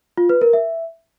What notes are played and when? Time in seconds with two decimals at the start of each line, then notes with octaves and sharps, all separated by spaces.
0.17 F4
0.29 B4
0.41 A#4
0.53 E5